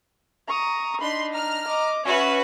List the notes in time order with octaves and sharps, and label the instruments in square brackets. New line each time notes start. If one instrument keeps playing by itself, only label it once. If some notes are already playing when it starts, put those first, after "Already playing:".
[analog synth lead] A#5 [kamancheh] C#6 D#6
[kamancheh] D4 D#4 [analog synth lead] B5 [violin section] C6
[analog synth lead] A#5 [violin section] F6
[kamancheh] D#5 D6
[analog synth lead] C#4 [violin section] F#4 B4 [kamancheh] C#5 E5